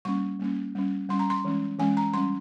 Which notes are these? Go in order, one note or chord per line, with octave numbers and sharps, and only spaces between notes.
G3 A#3 C#4 C#6
G3 A#3 C#4
G3 C#4
G3 C#4 C6
A#5
C6
E3 G#3 C#4
E3 G#3 C#4 G#5
A#5
G3 C#4 C6